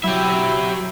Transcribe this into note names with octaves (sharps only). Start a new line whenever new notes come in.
F#3 E4 G4 E5